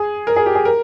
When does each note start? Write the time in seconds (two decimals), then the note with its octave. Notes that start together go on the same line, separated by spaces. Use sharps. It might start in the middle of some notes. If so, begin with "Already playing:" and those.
Already playing: G#4
0.27 A#4
0.36 G#4
0.46 G4
0.55 G#4
0.65 A#4